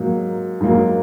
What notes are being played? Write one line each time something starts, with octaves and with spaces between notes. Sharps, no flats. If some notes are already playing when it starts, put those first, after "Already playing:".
Already playing: G#2 F#3 A#3
G#2 F#3 A#3